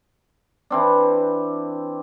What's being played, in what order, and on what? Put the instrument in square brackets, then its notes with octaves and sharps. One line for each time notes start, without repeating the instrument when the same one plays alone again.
[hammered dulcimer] E3 C4 D4